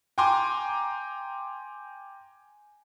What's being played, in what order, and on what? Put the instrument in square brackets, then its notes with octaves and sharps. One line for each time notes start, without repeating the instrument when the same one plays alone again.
[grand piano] G5 G#5 A#5 C6 D6